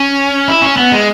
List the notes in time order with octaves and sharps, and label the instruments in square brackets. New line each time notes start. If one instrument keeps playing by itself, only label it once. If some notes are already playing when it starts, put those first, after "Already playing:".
Already playing: [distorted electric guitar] C#4
E4
C#4
B3
G#3